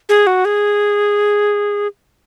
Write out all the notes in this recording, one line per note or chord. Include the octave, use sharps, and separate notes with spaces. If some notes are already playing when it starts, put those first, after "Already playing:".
G#4
F#4
G#4